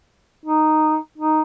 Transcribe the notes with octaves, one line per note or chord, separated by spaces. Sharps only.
D#4
D#4